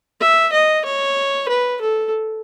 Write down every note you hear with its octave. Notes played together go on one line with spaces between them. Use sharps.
E5
D#5
C#5
B4
A4